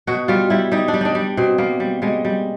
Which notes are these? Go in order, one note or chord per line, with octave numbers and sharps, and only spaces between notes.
B2 F#4
G3 F4
G3 E4
G3 D#4
D4
G3
D4 D#4
G3
B2 C4
G3 A#3
G3
G3 G#3
G3